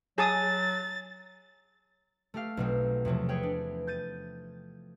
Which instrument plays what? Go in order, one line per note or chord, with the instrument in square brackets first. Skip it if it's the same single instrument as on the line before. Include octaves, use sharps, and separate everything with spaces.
[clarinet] F#3 [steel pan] G#4 A5 D#6 [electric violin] A6
[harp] A3 G4 F5
B1 B2 C4
E2 C3 F3 F#3
G#4 B4 C#5 G5
D4
G6 A6 D#7